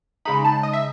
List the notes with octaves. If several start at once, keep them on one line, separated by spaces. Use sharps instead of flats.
C#3 G#3 D#4 B5
A5
D#5
E5